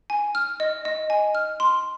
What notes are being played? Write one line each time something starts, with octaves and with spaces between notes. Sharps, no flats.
G#5
F6
D#5
D#5
G#5
F6
C6